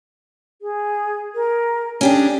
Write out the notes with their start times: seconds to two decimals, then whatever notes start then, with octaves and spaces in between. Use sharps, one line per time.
0.62 G#4
1.35 A#4
2.01 C#4 D4 G4 G#4